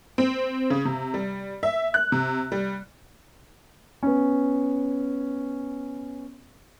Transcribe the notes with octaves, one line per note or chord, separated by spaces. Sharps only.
C4
C#3
C3
G3
E5
F#6
C3
G3
B3 C#4